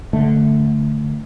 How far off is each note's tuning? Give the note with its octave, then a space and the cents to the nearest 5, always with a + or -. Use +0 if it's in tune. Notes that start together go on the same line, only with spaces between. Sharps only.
D3 +0 A3 +0